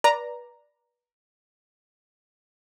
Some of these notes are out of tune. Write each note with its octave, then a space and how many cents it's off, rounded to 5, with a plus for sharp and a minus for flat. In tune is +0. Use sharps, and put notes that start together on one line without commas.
B4 -30 D5 +0 A#5 +0